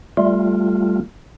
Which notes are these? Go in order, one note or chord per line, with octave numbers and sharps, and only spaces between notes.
G3 A3 F4